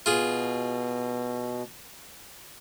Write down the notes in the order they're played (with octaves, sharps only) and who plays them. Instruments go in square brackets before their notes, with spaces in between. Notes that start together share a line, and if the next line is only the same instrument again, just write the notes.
[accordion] B2 [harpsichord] F4 G#4